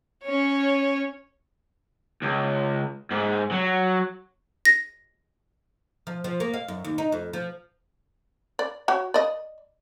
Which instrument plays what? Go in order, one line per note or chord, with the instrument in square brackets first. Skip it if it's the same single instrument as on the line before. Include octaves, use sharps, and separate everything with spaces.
[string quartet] C#4 C#5
[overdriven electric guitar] C#2
G#2
F#3
[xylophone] A#6
[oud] F3
F3
A#3
F5
F#2
D#2
D#4
F2
F3
[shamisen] D5
F#4 C#5
D5 D#5